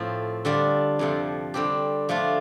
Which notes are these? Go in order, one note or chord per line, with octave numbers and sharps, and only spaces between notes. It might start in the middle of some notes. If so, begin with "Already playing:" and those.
Already playing: A2 F3 C4
D3 G3 D4 F4
F2 C3 F3
D3 G3 C4 G4
F3 A3 D4 F4